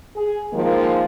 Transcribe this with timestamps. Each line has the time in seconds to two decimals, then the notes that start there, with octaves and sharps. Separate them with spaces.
0.16 G#4
0.53 D#3 F3 G#3 A#3